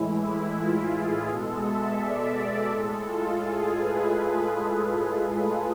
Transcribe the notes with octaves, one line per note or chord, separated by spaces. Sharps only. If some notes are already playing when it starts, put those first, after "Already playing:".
Already playing: A2 E3 G#3 E4
E4
F4
G#4
B2 G#3 A4
E5
D5
D5
A2 G#3 A4
F4
G#4
B4